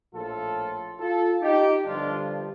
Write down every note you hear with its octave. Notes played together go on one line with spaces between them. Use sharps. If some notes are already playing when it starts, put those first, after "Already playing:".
A#1 A2 F3 F4 A4
F4 A4
D#4 G4
G1 G2 D3 F3 D4 F4